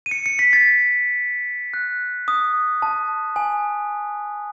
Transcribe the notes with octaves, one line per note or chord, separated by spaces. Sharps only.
D#7
C#7
C#7
B6
A6
F#6
D#6
A5
G#5